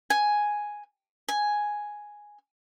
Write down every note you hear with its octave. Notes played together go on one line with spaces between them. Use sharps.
G#5
G#5